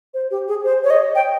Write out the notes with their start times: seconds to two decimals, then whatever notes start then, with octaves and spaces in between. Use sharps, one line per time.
0.14 C5
0.31 G4
0.48 G#4
0.65 C5
0.84 C#5
0.90 D#5
1.15 G5